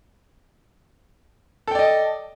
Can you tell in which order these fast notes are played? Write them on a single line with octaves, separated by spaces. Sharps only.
A4 G5 D5 D#5